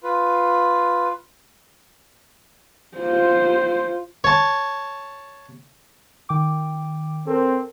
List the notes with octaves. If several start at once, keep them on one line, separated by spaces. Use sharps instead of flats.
F4 B4
F4 C5
C#5 A5
D#3 G5 D6
C4 A4 A#4